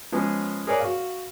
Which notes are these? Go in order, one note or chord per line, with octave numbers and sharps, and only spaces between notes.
F3 G#3 B3 C#4 G#4
G#4 A#4 B4 C#5 D5 G#5
F#4 F5